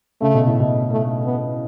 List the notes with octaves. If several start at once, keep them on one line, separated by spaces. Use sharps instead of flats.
C#3 A3
B2
A2
B2
A3
B3